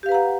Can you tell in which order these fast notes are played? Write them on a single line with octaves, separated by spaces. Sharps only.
G4 F5 B4 A#5 F#5